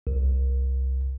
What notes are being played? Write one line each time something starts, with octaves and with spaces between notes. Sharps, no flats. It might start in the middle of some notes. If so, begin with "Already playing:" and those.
C2